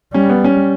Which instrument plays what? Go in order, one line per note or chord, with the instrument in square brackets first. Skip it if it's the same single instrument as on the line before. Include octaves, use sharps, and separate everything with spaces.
[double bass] G3 [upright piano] C#4
[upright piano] B3
C#4